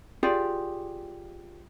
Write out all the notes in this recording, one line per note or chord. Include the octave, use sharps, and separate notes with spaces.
F4 G4 G#4 D5